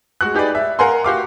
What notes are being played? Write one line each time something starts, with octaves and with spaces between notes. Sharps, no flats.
G#3 F#4 F#6
D#4 G4 G#4 B4 D5
E5
A#4 F5 F#5 G#5 A#5 C6
F#4 G4 F5 D6